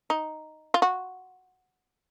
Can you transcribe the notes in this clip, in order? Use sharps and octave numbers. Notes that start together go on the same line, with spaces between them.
D#4
F4
F#4